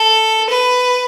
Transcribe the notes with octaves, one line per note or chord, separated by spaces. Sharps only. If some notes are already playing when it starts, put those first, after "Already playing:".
Already playing: A4
B4